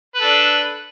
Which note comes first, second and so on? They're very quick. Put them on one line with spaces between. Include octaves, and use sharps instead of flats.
B4 A4 D4